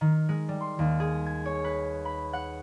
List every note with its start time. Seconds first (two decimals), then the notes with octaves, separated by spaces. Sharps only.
0.01 D#3
0.29 G#3
0.49 G3
0.61 C6
0.79 D#2
1.00 G#4
1.26 G#6
1.46 C#5
1.64 B4
2.05 B5
2.33 F#5